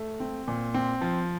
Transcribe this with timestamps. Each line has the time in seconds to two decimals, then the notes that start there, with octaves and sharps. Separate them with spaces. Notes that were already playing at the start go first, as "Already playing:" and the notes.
Already playing: A3
0.20 C4
0.48 A#2
0.74 C4
1.01 F3